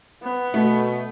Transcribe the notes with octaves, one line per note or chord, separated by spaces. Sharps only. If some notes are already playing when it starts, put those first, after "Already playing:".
B3
B2 A3